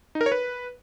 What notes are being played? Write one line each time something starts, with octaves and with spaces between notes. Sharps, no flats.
D#4
A#4
C#5
B4